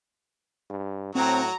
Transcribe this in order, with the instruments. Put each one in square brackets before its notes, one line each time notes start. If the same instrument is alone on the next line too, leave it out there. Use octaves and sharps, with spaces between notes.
[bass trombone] G2
[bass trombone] A2 [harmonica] F#3 F#4 [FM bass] C4 [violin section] A#5